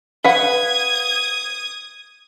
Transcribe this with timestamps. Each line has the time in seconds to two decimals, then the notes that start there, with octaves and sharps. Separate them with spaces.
0.24 B4 F5 F#5 D#6 G#6